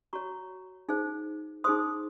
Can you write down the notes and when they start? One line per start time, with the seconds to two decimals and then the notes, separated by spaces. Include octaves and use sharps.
0.13 F#4 C#5 A#5 C#6
0.89 D#4 G#4 C5
1.64 D#4 G#4 C5 C6 D#6